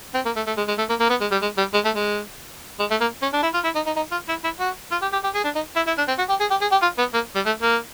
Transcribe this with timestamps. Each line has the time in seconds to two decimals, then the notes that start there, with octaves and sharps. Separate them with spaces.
0.14 C4
0.26 A#3
0.36 A3
0.47 A3
0.57 G#3
0.68 G#3
0.78 A3
0.89 A#3
1.00 A#3
1.10 B3
1.21 G#3
1.32 G3
1.42 G#3
1.58 G3
1.74 G#3
1.85 A3
1.96 G#3
2.79 G#3
2.90 A3
3.01 A#3
3.22 C#4
3.33 D4
3.43 E4
3.54 F4
3.64 E4
3.75 D#4
3.86 D#4
3.96 D#4
4.12 F4
4.29 E4
4.44 E4
4.60 F#4
4.91 F4
5.02 G4
5.13 G4
5.24 G4
5.34 G#4
5.44 D4
5.55 D#4
5.76 E4
5.87 E4
5.98 D4
6.08 C4
6.18 F#4
6.29 G4
6.40 G#4
6.51 G4
6.61 G#4
6.72 G4
6.82 F4
6.98 B3
7.14 A#3
7.35 G3
7.46 A3
7.62 A#3